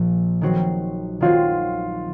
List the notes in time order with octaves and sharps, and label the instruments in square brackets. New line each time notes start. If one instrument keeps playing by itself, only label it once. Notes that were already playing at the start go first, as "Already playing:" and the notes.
Already playing: [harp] A#1 A#2 F3
D#3 F#3 C4 F#4 C5
[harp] D#3 F#3 C4 F#4 C5 [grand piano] F4